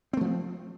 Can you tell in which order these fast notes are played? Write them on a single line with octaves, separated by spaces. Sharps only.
C4 A3 F3